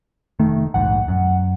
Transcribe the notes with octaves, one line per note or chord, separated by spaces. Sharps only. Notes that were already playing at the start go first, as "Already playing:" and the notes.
F1 D#3 A3
A#1 D#2 G#2 F#5
F#2